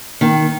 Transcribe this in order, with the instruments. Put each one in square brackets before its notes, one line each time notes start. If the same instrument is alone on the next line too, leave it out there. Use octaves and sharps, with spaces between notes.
[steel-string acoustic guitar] D#3 [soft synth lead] A#3